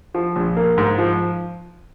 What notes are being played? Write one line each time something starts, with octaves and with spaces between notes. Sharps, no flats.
F3
A#1
A#3
G#2
F3